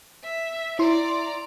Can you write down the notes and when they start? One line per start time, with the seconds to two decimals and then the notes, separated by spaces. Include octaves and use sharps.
0.24 E5
0.79 E4 D5 A#5 C6